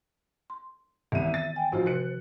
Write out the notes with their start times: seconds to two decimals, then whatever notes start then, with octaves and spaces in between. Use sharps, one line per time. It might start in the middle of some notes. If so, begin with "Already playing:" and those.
0.50 C6
1.12 C2 D#3 E3 G3 B3 E5 D#7
1.34 A6
1.56 G5 G#5
1.72 A1 F3 D#4 F4 F#4 C5
1.86 C3 F#6 C#7